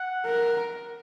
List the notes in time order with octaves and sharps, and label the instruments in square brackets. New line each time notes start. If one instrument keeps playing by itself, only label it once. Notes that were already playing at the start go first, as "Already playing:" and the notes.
Already playing: [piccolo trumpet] F#5
[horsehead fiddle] A#4